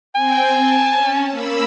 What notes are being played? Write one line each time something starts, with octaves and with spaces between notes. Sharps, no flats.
C4 G5 G#5
A5
C#4
A#3 B5 E6